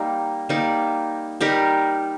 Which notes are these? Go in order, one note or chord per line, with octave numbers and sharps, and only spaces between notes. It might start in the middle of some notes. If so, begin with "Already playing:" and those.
Already playing: G3 A#3 D#4
G3 A#3 D#4
G3 D#4 G4 A#4